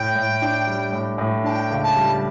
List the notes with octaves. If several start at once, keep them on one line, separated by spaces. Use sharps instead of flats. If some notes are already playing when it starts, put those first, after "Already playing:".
Already playing: A2 G5
A2
D4
G3
A2
A2
D4 G5 A5
C#2
A5
G3